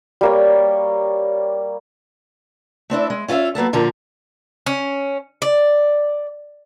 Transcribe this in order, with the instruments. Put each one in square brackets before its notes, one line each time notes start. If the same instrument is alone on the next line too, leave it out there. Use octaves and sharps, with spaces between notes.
[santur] G3 A#3 C#5
[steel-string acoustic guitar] A3 C4 D4 E4
G#3
C#4 F4 A#4 E5 F5
F#3 A#3 B3 A4
A#2 D3 F3 F#4 A#4
[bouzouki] C#4
D5